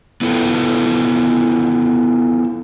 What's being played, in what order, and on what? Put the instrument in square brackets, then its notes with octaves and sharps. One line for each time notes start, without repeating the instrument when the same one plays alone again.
[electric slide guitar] B3 E4 F4 A4 G5